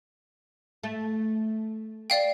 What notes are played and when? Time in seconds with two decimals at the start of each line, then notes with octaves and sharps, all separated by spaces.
0.84 A3
2.10 D5 F5 G5